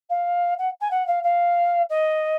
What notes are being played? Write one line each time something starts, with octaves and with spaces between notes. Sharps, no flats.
F5
F#5
G#5
F#5
F5
F5
D#5